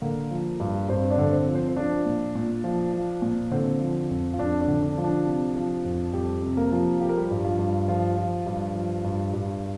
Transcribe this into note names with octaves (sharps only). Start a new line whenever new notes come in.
D3 A#3 A#4
F3
G2
G2 C4 C5
D4 D5
D3
C4 C5
F3
C4 C5
C5
F3 D4 D5
A#2
A#2
F3
F3
A#2
D3 C4 C5
F3
F2
F4
F2 D4
D4
D3
D4
F3
D4
C3
F3
F2
F2 G3 G4
C3
A#3 A#4
F3
F3 G4
A#4
G3 G4
G2
F3 F4
G2
F3 F4
F3
G2
F3
G2
G2